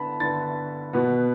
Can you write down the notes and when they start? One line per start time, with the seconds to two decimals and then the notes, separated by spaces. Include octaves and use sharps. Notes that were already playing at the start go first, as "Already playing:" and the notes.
Already playing: D3 B3 A5 B5
0.20 D3 B3 A6
0.93 B2 B3